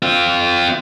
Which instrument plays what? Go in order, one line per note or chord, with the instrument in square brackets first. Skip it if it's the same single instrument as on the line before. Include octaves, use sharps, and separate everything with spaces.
[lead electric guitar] C4 F4